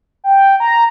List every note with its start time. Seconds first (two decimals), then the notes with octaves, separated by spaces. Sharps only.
0.24 G5
0.60 A#5